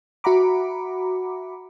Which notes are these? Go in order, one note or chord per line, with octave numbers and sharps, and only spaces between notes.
F#4 E5 F#5 A#5 B5 D6